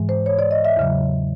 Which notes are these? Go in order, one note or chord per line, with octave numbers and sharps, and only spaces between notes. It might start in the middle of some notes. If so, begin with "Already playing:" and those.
Already playing: G#2 E3 G#3
C5
C#5
D5
D#5
E5
E2 C#3 F#3